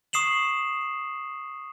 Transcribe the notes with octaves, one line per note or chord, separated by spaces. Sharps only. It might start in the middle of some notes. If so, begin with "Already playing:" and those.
C#6 D#6 C7 E7 F#7